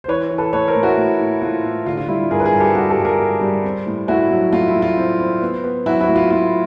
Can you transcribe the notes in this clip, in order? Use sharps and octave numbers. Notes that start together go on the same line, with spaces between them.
C5
E3 B4 C#5
E3
A4 B4
A2 B4 C#5
A#4 C5
A2
E4 F#4
A2
A2
A3 F4
A2
D3 F4
F4
G3 E4
G2 G#4 A#4
B4
G#4 A#4
G2
G4 A4
G3 F#4 G#4
G4 A4
G2
G#4 A#4
G3
G3
C4
A2
A3 E4 F#4
F#3
A3 F4
E4
A2
F4
C4
C4
B3
B3
F#3 E4 F#4
E4 F#4
A2
F4
A2 F4